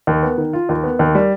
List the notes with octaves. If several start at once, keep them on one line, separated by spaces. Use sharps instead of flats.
D#2
B3
D#3
F4
D#2
B3
D#2
G3